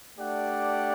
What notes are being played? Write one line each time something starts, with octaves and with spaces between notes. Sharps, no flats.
A3 D4 G4 D5 F#5